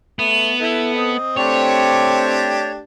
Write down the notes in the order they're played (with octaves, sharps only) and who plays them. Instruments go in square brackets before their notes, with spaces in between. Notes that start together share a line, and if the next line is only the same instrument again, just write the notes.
[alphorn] A3 [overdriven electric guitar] B3
[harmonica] E4 [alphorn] A4
[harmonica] C4 D#5
[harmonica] A3 D4 G4 [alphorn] C4 [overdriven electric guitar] C#5